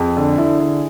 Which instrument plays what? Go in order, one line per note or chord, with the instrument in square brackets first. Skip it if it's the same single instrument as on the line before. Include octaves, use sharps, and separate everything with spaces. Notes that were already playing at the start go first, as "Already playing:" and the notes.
Already playing: [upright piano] F2 [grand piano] G#4
[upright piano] D3
[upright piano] D3 [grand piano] E4
[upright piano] D3